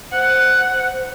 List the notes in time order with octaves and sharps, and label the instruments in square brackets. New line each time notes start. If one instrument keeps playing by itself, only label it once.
[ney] C5 [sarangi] F#5